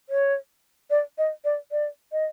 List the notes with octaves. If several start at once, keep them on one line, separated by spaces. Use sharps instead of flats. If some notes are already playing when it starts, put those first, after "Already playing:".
C#5
D5
D#5
D5
D5
D#5